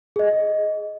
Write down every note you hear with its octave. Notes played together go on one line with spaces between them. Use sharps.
G#4 D#5